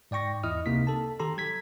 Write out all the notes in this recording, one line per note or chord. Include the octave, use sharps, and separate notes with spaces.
G#2 D5 G5 C#6 A#6
E2 E4 D#5 D#6 F6
C#2 C3 A#3 D#4 B6
A4 A5
D#3 G4 A4 A#5 C6
F#3 G#6 B6